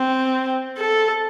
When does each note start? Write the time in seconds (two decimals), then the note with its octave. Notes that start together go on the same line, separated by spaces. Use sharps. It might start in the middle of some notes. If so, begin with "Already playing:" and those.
Already playing: C4
0.78 A4